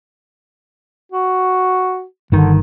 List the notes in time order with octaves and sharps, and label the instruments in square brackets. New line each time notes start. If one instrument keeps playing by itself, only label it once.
[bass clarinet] F#4
[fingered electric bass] G1 D#3 [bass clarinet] D3